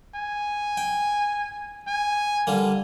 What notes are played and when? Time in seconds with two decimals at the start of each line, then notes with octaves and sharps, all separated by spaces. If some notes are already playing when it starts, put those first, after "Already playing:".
0.15 G#5
0.77 G5
1.87 G#5
2.47 D3 G3 A#3